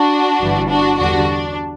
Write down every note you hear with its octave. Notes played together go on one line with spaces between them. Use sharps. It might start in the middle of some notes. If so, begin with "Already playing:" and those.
Already playing: D4 F#4
G1 G2 E3 G3
D4 F#4
E2 D3 G3 D4 F#4
D4